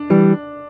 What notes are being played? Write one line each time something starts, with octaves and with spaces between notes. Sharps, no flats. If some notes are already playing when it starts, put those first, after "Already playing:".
Already playing: D4
E3 G3